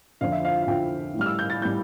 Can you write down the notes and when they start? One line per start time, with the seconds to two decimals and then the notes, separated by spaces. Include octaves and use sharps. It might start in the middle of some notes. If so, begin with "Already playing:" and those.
0.21 F2 D3 F3 F5
0.32 E5
0.45 F5
0.62 F5
0.67 F2 D3 F3 G5
1.14 A2
1.19 G3 F6
1.26 E6
1.39 G6
1.50 A6
1.61 A2 G3 G6